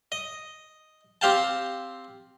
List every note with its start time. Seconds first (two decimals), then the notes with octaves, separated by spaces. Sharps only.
0.12 D#5
1.21 C4 G4 F5 G5 A5